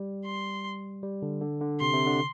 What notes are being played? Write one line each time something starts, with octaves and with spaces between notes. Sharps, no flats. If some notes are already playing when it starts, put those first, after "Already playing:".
Already playing: G3
C6
G3
D3
D3
D3
C3 C6
C3
D3